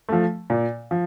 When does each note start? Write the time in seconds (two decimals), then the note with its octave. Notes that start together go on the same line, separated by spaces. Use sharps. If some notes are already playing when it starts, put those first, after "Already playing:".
0.09 F3 A3
0.50 A#2
0.91 F3